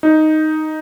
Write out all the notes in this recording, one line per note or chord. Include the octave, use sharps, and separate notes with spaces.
D#4